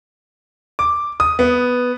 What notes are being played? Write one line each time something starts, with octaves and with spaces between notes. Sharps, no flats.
D6
D#6
B3